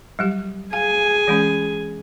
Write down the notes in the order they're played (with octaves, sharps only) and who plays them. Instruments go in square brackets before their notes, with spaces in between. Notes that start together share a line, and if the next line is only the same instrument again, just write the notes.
[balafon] F#3 G3 G4
[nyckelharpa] G#4 G#5 [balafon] F5
[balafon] E3 G#3 C#4